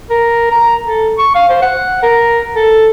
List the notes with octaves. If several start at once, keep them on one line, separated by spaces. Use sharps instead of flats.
A#4
A#5
A4
C#6
F5
C5
F#5
A#4
A4